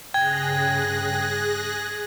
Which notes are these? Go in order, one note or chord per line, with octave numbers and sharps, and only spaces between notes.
G2 C#3 G#4 G5 F#6 G#6 A#6